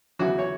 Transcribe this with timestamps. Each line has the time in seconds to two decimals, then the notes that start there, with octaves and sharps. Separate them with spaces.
0.19 E2 C#3 F#3 F#4
0.38 C#5